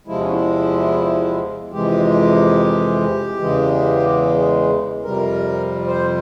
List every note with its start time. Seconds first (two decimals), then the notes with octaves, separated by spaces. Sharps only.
0.07 E2 C3 F3 G#3 E4
0.20 C#4
0.33 E4
1.72 F2 C3 E3 G#3 G4
3.39 E2 C#3 E3 G#3
5.04 F2 C3 G3 A#4
5.87 C5